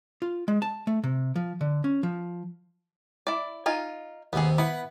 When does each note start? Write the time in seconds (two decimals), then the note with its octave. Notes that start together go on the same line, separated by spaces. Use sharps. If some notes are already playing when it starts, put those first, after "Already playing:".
0.22 F4
0.48 G#3
0.62 A5
0.87 A3
1.04 C3
1.36 F3
1.61 D3
1.84 C#4
2.03 F3
3.27 E4 D5
3.66 D#4 F4 G#5
4.33 D#2 C3 B3 G#4
4.58 B3 E4 F#5